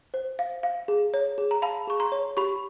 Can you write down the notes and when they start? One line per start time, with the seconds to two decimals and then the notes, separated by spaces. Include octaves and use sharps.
0.14 C5
0.39 F5
0.63 F5
0.88 G#4
1.14 C#5
1.38 G#4
1.51 A#5
1.62 F5 A5 B5
1.87 G#4 C#6
2.00 A#5 C6
2.12 C#5
2.37 G4 B5 C#6